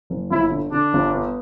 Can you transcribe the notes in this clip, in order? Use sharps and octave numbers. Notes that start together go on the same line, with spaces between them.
F#1
G1 E4
D3
D3 D4
G1
B3